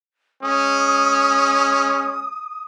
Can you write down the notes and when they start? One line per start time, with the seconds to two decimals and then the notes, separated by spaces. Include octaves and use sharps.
0.43 G#3 C#4 D#6